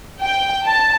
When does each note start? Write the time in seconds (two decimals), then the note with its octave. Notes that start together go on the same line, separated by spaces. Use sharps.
0.22 G5
0.65 A5